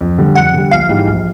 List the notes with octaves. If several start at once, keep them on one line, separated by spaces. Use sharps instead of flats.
F2
D3 G3
F2 F#5
D3 G3
A#1 F5
G#2 E3 G3
A#1